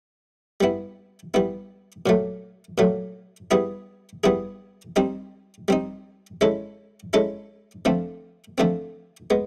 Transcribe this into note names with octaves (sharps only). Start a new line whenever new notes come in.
G3 B3 E4
G3 B3 E4
A#2 F#3 A3
A#2 F#3 A3
G3 B3 E4 G#4
G3 B3 E4 G#4
G3 C4 D#4
G3 C4 D#4
G#3 C#4 E4 A4
G#3 C#4 E4 A4
D3 F3 A3 C4
D3 F3 A3 C4
G#3 B3